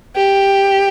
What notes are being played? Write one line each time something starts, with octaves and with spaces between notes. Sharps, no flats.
G4